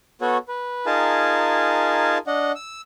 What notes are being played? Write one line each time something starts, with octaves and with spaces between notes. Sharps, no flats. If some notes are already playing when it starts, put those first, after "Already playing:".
B3 F#4 A4 C#5
B4
D#4 F4 G#4 A#4 G#5 A5
D4 D#5 F#5
E6